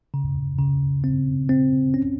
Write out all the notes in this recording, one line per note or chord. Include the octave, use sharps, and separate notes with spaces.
C#3
C#3
C4
C4
C#4